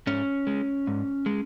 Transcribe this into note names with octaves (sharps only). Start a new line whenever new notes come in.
G#2 C#4
G#3
G#2
G#3